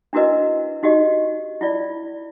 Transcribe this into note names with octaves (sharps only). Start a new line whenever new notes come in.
D4 E4 F#4 A#4 B4 D#5
D#4 F#4 G4 D#5
E4 F4 D5